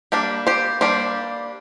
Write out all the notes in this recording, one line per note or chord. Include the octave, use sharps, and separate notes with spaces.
G3 A#3 D4 G4
G4 C5
G3 A#3 D4 G4 C5